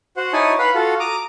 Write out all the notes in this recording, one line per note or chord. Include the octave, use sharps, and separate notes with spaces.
F#4 C5 F#5
D#4 E4 C#5 G#5 A5 D#6
B4 F5 F#5 B5
F4 F#4 A4
A#5 D6 D#6